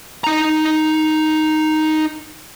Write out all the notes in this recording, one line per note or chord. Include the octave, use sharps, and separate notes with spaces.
D#4 A#5